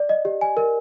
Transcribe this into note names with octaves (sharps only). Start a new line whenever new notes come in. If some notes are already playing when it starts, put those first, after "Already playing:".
Already playing: D5
D#5
G4
G#5
A#4